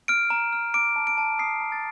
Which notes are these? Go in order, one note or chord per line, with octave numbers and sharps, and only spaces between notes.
F6 D7
A#5
F6
D6 D7
A5
D7
A5
D#6 C7
A#5
A6